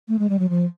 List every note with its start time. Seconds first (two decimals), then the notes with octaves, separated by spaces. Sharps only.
0.08 A3
0.19 G#3
0.29 G3
0.39 F#3
0.49 F3